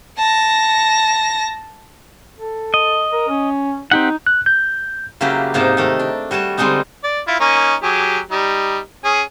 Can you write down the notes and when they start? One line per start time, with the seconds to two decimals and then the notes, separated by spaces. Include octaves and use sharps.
0.17 A5 A#6
2.39 A4
2.74 D#5
3.12 A#4
3.28 C#4
3.91 C4 D#4 G4 F#5
4.27 F#6
4.46 G6
5.21 C#3 F#3 A#3 E4 G4 B4
5.54 G#2 C3 A#3 D#4 D5 A5
5.77 D#3 A3 A#4
5.99 D4
6.31 G3 F#4 C#5 A5
6.57 D3 G3 G#3 C4 D4 D#4
7.04 D5
7.27 E4 F4
7.40 A#3 C#4 D#4
7.83 F#3 G4 G#4
8.31 G3 D#4
9.04 C#4 G#4